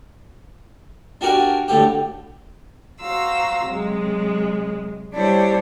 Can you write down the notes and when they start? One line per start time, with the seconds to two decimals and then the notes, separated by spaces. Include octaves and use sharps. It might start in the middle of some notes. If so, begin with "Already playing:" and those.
1.21 D4 F#4 G4 A#4 F#5 G#5
1.68 A2 D3 G4
3.01 F#4 C5 F5 A#5 E6
3.66 C3 F#3 G#3
5.14 G3 D4 E4 G4 C5 C#5